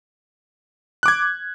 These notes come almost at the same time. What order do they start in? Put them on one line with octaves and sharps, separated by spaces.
F#6 D6 G#6